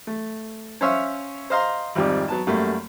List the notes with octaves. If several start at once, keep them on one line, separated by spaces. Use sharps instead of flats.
A3
C#4 C5 C#5 E5 F5
C5 D#5 F5 A#5 C6
G#1 F2 G3 D5
F#3 B3 A5
F#2 G3 A3 A#3